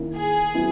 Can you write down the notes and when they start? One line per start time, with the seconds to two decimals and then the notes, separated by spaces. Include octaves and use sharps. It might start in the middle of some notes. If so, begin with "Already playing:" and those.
Already playing: D#3 A#3 C#4 E4
0.17 G#4
0.54 F#3 B3 E4